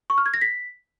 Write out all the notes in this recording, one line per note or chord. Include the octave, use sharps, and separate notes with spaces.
C#6
F6
G#6
A#6
B6